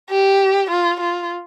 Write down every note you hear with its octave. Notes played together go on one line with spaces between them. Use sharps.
G4
F4
F4